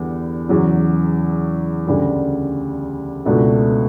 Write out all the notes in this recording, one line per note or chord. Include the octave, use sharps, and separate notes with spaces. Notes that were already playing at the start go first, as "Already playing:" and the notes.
Already playing: E2 D3 G3 B3
E2 C#3 F#3
D2 C#3 G3
C#2 B2 A3 D4